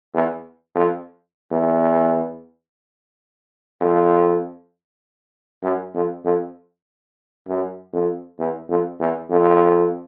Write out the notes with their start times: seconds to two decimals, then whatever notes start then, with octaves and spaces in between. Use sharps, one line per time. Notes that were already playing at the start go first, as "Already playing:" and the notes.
0.14 E2
0.75 F2
1.52 E2
3.81 F2
5.63 F#2
5.94 F2
6.25 F2
7.47 F#2
7.93 F2
8.39 E2
8.69 F2
9.00 E2
9.30 F2